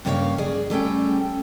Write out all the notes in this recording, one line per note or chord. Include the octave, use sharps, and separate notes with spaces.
G2 C#3 A#3 C#4 C#5 F5
G#4 D5
G3 A3 C#4 G5